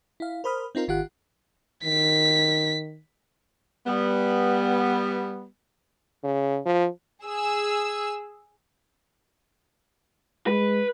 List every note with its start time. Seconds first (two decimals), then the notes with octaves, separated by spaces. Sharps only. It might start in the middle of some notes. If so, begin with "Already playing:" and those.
0.20 E4 F5
0.44 A#4 C5 B5 D#6 F6
0.75 C4 D#4 F4 A#4
0.88 G#1 D#3 F4 G4 F#5 F#6
1.85 D#3 B6
3.86 G3 B3
6.24 C#3
6.66 F3
7.25 G#4 E6
10.47 G#3 B4